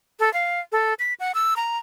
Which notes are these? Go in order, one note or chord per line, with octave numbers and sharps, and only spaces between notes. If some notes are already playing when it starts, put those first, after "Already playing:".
A4
F5
A4
B6
F#5
E6
A#5